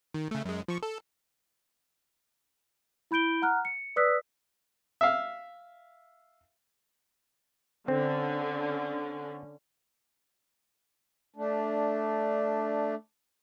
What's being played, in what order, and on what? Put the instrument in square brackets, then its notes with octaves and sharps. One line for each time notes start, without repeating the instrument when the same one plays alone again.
[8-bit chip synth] D#3
C#3 A3
F#2 G#3
F3 C#6
A4
[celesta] E4 B5 G6 D7 G7
F#5 A#5 F6 F#6
C#7
B4 D5 D#6 E6 F#6 B6
[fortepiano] E5 F5
[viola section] D3 C#4 [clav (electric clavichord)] C4
[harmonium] A3 D4